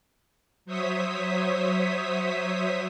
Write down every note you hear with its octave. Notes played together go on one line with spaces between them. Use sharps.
F#3 C5 C#5 E5 D#6 B6